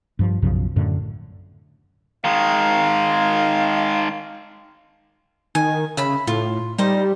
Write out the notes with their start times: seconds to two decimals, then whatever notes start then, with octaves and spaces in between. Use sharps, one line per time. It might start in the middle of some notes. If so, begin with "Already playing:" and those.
0.19 G2 F3
0.42 B1 F#2 C#3 F3
0.76 F#2 A2 D3
2.24 D#3 G#3 F5
5.55 D#3 G#5
5.97 C#3 E5 B5
6.27 A2 F4
6.78 G3 D#4 C5